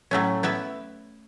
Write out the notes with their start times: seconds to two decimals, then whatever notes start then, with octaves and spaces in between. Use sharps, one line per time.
0.11 A2 F#3 A3 C#4
0.43 B3 E4 B4 E5